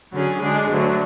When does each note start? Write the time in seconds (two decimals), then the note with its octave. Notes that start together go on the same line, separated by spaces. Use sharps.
0.12 D3 F#3 C#4 G#4
0.41 D3 G#3 D4 G#4
0.70 D2 D3 F#3 A3